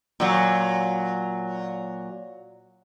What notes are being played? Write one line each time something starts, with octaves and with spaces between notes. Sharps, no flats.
A#2 F#3